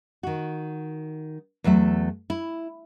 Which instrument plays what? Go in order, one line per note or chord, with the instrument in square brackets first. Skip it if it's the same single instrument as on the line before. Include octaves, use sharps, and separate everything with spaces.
[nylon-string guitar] D#3 F#4
E2 F#3 A3 E5
E4